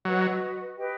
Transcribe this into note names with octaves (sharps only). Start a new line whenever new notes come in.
F#3 F#4 B4 D#5
G4 B4 D#5 G5